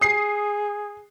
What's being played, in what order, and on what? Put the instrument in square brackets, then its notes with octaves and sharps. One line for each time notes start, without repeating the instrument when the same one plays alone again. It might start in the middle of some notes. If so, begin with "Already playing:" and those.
[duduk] G#4 [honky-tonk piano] D#6 C7